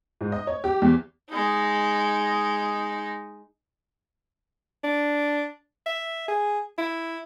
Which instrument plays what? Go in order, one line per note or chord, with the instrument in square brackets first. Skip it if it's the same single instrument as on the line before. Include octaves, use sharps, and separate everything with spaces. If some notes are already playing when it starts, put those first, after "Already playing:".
[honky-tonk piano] G#2
D#5
C#5
G4
E2
[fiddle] G#3 D#4
[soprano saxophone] D4
E5
G#4
E4